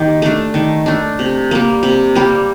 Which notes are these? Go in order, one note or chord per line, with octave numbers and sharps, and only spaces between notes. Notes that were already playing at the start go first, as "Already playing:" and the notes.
Already playing: D#3 A#3 D#4 G4
A3 D4
D#3
A3 D4
C3
G3 A#3
C3
G3 A#3